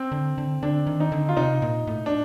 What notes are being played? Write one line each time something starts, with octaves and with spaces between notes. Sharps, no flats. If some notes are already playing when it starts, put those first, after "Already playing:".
Already playing: C4
D3
D3
D3 D4
D#3
D#4
D3
F4
C3 D#4
A#2
A2
D4